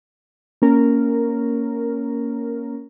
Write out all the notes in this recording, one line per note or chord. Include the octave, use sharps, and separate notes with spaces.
A#3 C#4 A#4